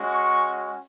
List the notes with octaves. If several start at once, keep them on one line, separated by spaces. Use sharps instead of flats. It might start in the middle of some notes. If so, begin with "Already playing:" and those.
Already playing: G#3 C#4 F#4
C#6